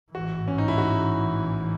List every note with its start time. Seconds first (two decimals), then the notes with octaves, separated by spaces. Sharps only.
0.15 A1 G#2 E3 F#4
0.48 C#4
0.58 D#4
0.68 E4
0.78 F#4